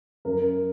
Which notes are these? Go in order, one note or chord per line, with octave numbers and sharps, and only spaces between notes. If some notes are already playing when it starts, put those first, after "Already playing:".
F#2 A#4